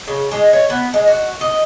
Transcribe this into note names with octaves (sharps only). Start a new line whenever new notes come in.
C#3
G#3
C#5
B3
G#3
F#4
D#5